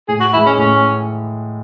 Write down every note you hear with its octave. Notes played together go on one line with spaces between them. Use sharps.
A2 G#4
F#4
E3 G#3 E4
C#4
A2 C#4